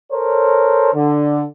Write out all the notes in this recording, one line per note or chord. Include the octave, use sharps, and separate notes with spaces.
A4 A#4 C5 C#5
D3